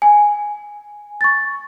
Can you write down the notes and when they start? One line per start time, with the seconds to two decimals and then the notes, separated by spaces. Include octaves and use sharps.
0.02 G#5
1.21 C#6 A6